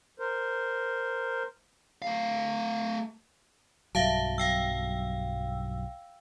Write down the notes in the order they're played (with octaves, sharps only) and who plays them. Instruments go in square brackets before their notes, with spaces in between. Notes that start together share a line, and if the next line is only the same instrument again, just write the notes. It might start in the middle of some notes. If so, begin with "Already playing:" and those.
[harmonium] A#4 C5
[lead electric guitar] A3 F5
[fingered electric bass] B1 G2 F#3 [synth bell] E5 F5 A5
[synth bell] F5 G5 E6